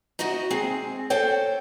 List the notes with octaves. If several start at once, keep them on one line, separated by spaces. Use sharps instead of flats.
D#4 E4 F#4 D#5
G#3 C4 G#4
A4 C5 C#5 G5